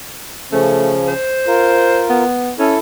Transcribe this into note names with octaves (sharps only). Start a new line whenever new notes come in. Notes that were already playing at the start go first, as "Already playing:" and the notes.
C#3 F3 A3 C#4
C5
F4 A#4
B3
C#4 E4 A4